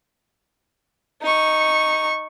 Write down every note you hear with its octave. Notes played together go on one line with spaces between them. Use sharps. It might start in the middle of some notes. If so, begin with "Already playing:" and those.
D#4 C#6